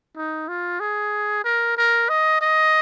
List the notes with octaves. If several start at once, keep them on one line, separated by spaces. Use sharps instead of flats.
D#4
F4
G#4
A#4
A#4
D#5
D#5